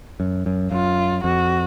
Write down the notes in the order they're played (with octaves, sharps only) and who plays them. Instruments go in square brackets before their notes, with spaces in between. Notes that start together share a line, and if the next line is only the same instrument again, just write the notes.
[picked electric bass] F#2
F#2
[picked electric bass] F#2 [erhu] F4
[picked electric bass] F2 [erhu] F#4